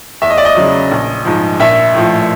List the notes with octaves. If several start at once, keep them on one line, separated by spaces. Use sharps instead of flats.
E2 E5
D#5
D5
D#5
C#3 F#3
A#1
G#2 F3
A#1 E5
A2 F3